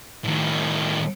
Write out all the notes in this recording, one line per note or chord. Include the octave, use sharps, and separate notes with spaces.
A2 D#3